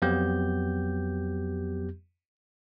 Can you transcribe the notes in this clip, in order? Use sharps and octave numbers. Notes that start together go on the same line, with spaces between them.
F2 F#3 B3 G4 G6